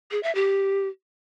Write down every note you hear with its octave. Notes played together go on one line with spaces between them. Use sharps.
G#4
E5
G4